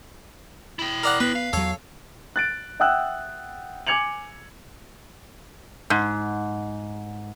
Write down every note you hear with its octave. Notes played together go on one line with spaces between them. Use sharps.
E4 G5
A#4 D5 F#5
B3 B4
F5
E2 F#3 A4 C#5
F#6 A6 D7
E5 F#5 G5 D#6 E6 F#6
G#5 D6 G#6 C#7 F7 F#7
G#2